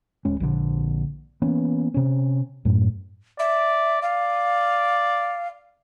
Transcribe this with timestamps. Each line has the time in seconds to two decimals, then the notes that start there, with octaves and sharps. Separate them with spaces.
0.25 D#1 G#3 C#4
0.40 A#1 D3
1.42 E3 A#3 B3 C#4
1.94 C3 C#4
2.65 F#2 A2
3.39 D5 E5
4.02 D5 F5